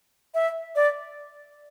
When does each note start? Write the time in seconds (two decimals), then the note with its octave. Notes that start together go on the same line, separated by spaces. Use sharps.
0.34 E5
0.76 D5